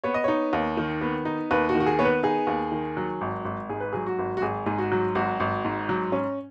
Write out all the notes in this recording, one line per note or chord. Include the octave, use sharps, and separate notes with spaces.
B3 C#5
D#5
D#4 C#5
D#2
D#3
B3
D#4
D#2 B4
F#4
D#3
F#4
G#4
B3 C#5
B4
D#4 G#4
D#2
D#3
F#3
G#1
G#1
G#2 G#4
B4
F#3 G#4
F#4
G#1
F#4
G#1 G#4
G#2 G#4
F#4
F#3
G#1 F#4
G#1
G#2
F#3
C#4